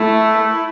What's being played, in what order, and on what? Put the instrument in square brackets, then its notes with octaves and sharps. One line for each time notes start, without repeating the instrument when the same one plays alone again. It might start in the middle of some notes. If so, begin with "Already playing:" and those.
Already playing: [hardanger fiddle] A3 [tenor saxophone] E4